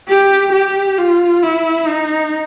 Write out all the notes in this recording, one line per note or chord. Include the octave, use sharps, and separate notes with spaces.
G4
G4
F4
E4
D#4